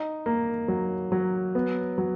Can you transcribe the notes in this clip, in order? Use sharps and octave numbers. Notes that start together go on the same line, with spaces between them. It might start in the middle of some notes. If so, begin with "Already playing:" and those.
Already playing: D#4
A#3
F#3
F#3
B3
F#3